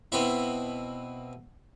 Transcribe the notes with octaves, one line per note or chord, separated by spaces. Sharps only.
B2 C4 E4